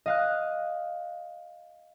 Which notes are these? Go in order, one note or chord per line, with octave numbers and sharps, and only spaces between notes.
D#5 F5 F#6